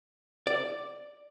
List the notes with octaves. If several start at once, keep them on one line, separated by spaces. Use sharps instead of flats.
D5